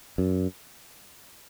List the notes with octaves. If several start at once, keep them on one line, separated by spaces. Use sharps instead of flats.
F#2